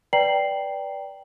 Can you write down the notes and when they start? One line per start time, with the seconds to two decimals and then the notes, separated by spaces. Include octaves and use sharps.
0.13 B4 D5 G5 A#5 C7 F#7